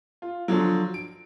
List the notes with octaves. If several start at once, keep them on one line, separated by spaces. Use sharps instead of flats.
F4
D3 F3 F#3
D7